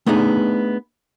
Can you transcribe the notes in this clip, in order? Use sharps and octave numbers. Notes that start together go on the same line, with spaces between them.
A3 B3 D4 D#4 G#4